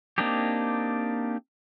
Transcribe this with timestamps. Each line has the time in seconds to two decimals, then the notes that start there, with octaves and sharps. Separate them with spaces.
0.18 A#3 C4 D4 D#4 G4